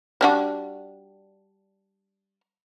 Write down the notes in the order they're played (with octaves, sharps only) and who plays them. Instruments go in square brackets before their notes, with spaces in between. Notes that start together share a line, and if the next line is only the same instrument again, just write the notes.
[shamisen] G3 D4 F#4